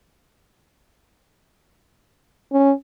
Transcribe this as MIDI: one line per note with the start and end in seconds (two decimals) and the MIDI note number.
2.52 2.71 61